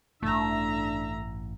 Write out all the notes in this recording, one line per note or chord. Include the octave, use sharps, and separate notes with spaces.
A1 G2 E3 A3 D4 E5 A#5